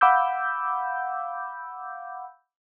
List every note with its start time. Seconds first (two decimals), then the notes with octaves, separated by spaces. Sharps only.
0.01 F5 F#5 B5 D6 E6 G6